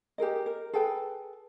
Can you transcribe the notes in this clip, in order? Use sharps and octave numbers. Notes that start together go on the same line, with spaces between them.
G4 G#4 A#4 D#5
A#4
G#4 A4 B4 G5